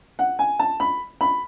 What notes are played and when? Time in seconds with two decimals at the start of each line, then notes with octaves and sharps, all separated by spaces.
0.19 F#5
0.39 G#5
0.59 A5
0.80 B5
1.21 B5